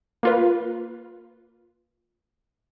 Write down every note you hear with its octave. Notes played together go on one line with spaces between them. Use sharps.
A#3 F4 B4